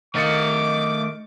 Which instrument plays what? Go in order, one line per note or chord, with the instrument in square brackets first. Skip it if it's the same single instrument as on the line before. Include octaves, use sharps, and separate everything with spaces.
[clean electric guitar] D#3 [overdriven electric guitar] A3 F5 [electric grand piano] D#5 A6 C#7 [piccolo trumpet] D6